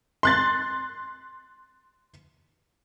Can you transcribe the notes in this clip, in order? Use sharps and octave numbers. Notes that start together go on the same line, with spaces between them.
C6 F#6 A6